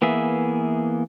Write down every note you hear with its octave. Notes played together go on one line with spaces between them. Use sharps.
E3 A#3 B3 G#4 E5